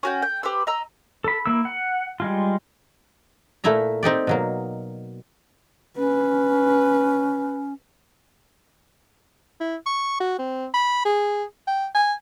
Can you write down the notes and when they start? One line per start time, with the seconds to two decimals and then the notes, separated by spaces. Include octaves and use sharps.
0.03 C#4 F#4 G5
0.22 G5
0.43 G4 B4 C5 E6
0.67 D#5 A#5 E6
1.24 A4 B5
1.46 A#3 E4 E6
1.65 F#5
2.20 G3 G#3 F4
3.64 A#2 A3 A#3 E4 E5 A#5
4.03 C4 D#4 G4 D5
4.27 B2 F#3 A#3
5.97 C#4 B4
9.61 E4
9.86 C#6
10.20 F#4
10.39 C4
10.74 B5
11.05 G#4
11.68 G5
11.95 G#5